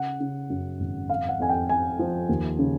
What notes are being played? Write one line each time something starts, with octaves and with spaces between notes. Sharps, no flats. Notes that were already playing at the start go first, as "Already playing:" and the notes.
Already playing: C#3 F#5
C#3
F#2
G#1
F2 F5
F#5
F2 G#5
G5
F2 G#5
F3
D#2
C#3